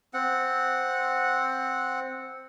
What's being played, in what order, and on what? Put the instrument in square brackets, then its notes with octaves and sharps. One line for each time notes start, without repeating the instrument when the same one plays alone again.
[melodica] C4 F#5